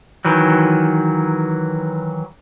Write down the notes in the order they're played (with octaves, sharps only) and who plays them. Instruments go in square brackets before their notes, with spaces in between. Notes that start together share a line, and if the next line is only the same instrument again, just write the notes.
[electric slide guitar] D#3 E3 F#3